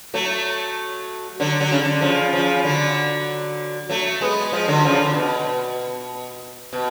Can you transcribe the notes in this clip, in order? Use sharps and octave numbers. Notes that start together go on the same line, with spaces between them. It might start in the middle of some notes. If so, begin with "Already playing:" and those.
F#3 A3
D3 F#3
D3 F#3
C#3
D3
C#3 F3
C#3 F3
D3 F#3
F#3 A3
G#3 B3
F3 G#3
D3 F#3
C#3 F3
D3
B2
B2